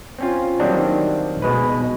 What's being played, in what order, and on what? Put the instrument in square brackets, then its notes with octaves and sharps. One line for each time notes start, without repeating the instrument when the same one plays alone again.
[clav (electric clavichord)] C4 C#4 F4
D#3 F#3 G3 A#3 C4 D4
B2 G#3 B4